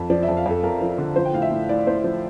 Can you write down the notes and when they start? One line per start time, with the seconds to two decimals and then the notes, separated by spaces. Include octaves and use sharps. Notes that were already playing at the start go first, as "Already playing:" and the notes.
Already playing: F2
0.10 F3 D5
0.23 E5
0.28 F2
0.37 F5
0.46 F2 A4
0.64 F2 A#4
0.81 F3
0.98 D3
1.16 F3 C5
1.25 G5
1.33 A2 F5
1.42 E5
1.51 A2
1.69 A2 D5
1.87 A2 C5
2.04 F3